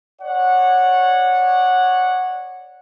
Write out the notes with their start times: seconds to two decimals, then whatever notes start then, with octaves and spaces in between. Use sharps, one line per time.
0.21 C#5 D5 F#5